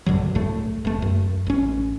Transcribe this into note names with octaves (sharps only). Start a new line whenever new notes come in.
A#1 G2 D3 F#3
C2 A2 A3
E1 A3
F#2
A1 C#4